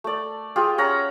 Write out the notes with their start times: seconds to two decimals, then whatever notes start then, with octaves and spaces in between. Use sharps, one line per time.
0.04 A3 D5
0.56 F4 G4 G#4
0.78 C#4 F#5 A#5